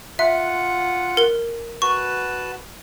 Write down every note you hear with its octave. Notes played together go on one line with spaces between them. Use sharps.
F4 E5 F#5
A#4 G7
F#4 B4 A5 C#6